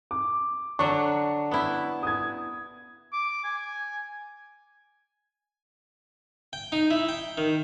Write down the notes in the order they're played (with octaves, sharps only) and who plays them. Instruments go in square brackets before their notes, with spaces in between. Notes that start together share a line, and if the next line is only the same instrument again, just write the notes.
[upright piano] D6
[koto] D3 F#3 D4 [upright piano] C#6
[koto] B3 E4
[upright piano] D#6 G#6
[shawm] D6
G#5
[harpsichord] G5
D#4
E4
G5
D#3